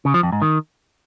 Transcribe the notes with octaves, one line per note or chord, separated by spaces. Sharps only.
C#3
F3
F2
G#2
D#3